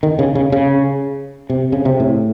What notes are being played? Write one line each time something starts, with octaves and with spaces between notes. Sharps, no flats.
D#3
C#3
C#3
C#3
C3
C#3
C3
A2